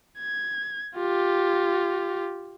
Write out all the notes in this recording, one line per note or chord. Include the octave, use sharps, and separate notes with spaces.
G#6
F4 G4